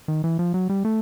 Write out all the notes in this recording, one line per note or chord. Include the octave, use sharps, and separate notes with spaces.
D#3
E3
F3
F#3
G3
A3